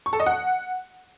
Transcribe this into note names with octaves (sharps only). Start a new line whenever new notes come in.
C#6
A4
D#5
F#5